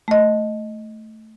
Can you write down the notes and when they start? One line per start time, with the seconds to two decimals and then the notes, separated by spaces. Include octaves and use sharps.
0.08 A3 D#5